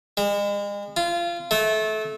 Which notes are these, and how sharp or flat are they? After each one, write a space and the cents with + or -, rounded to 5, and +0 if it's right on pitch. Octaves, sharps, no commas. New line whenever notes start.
G#3 -40
F4 -25
A3 -25